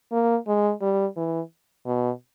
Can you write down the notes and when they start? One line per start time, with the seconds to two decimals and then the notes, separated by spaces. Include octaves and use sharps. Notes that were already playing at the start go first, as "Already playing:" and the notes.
0.12 A#3
0.47 G#3
0.82 G3
1.16 E3
1.86 B2